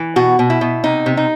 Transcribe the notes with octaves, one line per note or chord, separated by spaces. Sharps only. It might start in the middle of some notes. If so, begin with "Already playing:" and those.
Already playing: E3
B2 F#4
B2
E4
B2
C3 D#4
C3
D#4